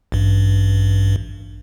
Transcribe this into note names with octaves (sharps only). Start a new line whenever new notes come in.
A1 G2